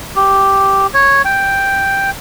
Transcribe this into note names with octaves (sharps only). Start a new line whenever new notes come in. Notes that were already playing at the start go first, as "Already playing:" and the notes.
G4
C#5
G5